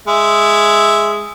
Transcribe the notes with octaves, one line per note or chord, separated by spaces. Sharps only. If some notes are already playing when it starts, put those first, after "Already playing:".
G#3 E5